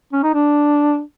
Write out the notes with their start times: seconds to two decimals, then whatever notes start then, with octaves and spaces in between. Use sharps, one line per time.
0.12 C#4
0.23 D#4
0.34 D4